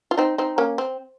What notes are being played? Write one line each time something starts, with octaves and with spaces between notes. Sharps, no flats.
F4
C4 D#4
C4 D#4
A#3 C#4
C4